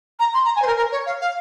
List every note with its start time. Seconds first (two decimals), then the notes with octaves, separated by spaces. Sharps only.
0.19 A#5
0.34 C6
0.45 A#5
0.56 G#5
0.62 C5
0.66 A#4
0.77 A#4
0.91 C#5
1.06 F5
1.21 F5